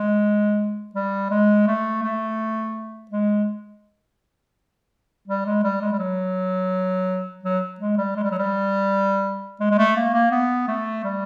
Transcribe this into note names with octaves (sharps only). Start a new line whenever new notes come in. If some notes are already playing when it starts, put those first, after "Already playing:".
Already playing: G#3
G3
G#3
A3
A3
G#3
G3
G#3
G3
G#3
G3
F#3
F#3
G#3
G3
G#3
G3
F#3
G3
G#3
G#3
A3
A#3
A#3
B3
A3
G3